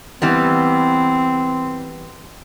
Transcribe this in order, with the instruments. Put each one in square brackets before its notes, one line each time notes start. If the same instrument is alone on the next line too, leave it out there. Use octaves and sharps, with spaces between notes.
[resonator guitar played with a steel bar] E3 G3 B3 [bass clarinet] C4